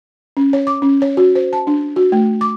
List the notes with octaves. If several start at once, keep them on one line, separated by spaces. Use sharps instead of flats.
C#4
C#5
D6
C#4
C#5
F#4
C5
A5
D4
F#4
A3
D6